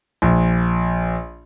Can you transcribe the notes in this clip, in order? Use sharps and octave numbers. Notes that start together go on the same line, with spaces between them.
A#1